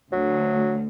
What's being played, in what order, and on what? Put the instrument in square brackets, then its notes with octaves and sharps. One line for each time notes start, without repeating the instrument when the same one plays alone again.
[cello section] D2 [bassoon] F#3